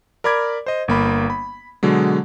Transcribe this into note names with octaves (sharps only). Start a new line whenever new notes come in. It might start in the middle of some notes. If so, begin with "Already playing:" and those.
A#4 D5 B5 D6 G#6
C5 D#5
G1 A#3 B5
B5
B2 D3 F#3 G#3